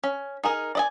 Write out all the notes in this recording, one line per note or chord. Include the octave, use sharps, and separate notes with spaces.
C#4
D#4 G#4 A#4
D5 D#5 G#5